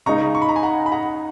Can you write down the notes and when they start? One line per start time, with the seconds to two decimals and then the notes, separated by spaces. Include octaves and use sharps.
0.06 C#3 G#3 D#4 A#5 C#6
0.35 C#6
0.42 B5
0.49 A#5
0.56 G#5 B5
0.63 F#5 A#5
0.86 B5
0.92 F#5 A#5